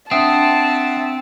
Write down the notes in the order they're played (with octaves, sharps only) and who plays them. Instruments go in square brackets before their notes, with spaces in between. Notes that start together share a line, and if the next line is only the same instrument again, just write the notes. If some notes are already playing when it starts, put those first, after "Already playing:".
[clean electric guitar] C4 [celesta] D4 D#6 [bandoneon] E5 F#5 [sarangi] A5